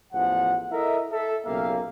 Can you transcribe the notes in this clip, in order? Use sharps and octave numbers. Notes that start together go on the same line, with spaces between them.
A1 E2 F3 F#5
E4 A4 A#4 D#5 E5
A4 E5
B1 C#3 A#3 G4 E5 F5